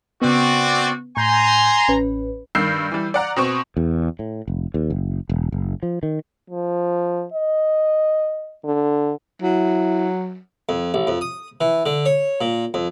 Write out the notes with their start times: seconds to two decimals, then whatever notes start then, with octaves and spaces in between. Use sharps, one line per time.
0.22 C#3 B3 C4 F#4 D5
1.17 A2 G#5 A#5 C6 G6
1.88 A1 C#4 B4
2.55 G2 D#3 E6 G6 C7
2.92 E3 G3
3.14 D5 F#5 A#5
3.36 B2 C4 C#6 E7
3.77 E2
4.19 A2
4.48 F1
4.74 D#2
4.90 F#1
5.29 E1
5.52 F#1
5.83 F3
6.03 D#3
6.50 F3
7.33 D#5
8.64 D3
9.42 F#3 E4
10.69 F2
10.94 A1
11.07 F2
11.21 D#6
11.61 E3
11.86 D3
12.06 C#5
12.41 A#2
12.74 F2